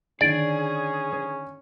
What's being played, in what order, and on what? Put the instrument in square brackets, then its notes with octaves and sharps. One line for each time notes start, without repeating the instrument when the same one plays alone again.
[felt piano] D3 D#3 [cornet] C#4 [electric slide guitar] G#4 [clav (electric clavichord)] D5